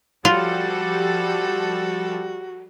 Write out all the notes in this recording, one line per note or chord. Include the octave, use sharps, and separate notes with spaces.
F3 G3 F4 F#4 A4